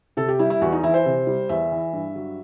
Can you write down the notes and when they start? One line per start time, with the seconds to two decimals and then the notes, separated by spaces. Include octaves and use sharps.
0.17 C3 A4
0.28 G4
0.39 G3 E4
0.50 E4
0.61 E2 F#4
0.72 D#4
0.83 E3 E4
0.94 C5
1.06 C3
1.27 G3
1.49 E2 E5
1.72 E3
1.93 G2
2.16 F#3